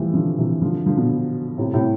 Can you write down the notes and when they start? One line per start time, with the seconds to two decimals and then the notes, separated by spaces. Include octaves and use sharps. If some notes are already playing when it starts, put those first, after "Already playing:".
Already playing: E3 F3 G3 A3
0.14 D3 F3
0.38 C3 E3
0.62 D3 F3
0.86 D3 F3
0.97 B2 D3
1.58 A2 C3
1.73 A2 C3